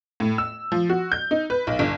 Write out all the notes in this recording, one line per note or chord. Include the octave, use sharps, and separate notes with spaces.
A2
E6
F3
F#4
G6
D#4
B4
B1
G1